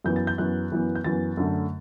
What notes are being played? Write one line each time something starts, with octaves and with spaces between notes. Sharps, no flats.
F#2 E3 B3 G6
A6
G6
F#2 E3 B3 F#6
F#2 E3 B3
G6
F#2 E3 B3 A6
F#2 D3 A3